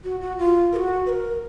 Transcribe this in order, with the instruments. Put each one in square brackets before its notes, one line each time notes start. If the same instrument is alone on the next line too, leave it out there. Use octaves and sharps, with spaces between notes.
[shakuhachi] F#4
F#4
F4
A#4
F#4
B4
A#4